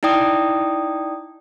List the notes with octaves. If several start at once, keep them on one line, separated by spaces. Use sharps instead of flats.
D#4 E4 D5 G5 D#6